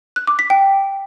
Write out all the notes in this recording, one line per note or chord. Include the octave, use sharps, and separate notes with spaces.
F#6
D6
B6
G5